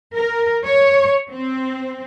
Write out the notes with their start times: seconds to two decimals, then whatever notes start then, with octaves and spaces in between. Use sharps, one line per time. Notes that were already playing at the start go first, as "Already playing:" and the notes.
0.14 A#4
0.65 C#5
1.30 C4